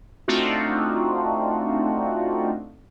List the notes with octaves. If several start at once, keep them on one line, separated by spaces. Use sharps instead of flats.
A3 C4 D4 D#4 F4 F#4